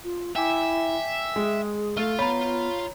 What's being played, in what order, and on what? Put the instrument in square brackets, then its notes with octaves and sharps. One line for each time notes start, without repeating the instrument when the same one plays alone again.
[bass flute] F4
[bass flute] E4 [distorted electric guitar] E5 [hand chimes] G5 G#5 D6
[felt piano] G#3 [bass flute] G#4
[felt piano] A3 [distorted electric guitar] F4
[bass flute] B3 [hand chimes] C#5 A#5 [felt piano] B5